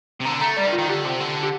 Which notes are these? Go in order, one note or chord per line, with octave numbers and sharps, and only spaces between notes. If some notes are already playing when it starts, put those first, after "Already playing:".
C3
D3 A#5
A3 A#5
G3 D5
D#3
F4
D#3
D3 G4
C3
D3
G4